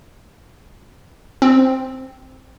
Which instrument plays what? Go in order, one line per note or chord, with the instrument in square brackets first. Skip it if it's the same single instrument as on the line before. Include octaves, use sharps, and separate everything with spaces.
[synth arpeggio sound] C4